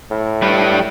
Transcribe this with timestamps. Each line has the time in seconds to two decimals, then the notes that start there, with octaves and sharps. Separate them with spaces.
0.11 A2
0.42 G3 B4